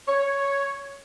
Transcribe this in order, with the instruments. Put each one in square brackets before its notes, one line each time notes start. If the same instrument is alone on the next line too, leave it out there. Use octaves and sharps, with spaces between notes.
[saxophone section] C#5